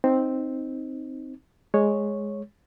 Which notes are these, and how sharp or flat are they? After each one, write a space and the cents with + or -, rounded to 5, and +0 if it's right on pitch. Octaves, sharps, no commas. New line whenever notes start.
C4 +0 D#4 +0
G#3 +0 C#5 -5